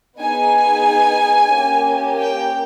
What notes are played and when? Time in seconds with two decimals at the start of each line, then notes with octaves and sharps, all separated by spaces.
0.19 B3 D#4 G#4 G#5
1.52 A#3 C#4 G4
2.19 G5